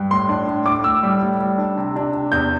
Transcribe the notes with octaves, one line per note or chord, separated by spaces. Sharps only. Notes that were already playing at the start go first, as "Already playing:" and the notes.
Already playing: G2
A2 C6
D4
A2
A2 D6
A2 E6
G3
A2
G3
D4
C3
D4
C3
E2 G6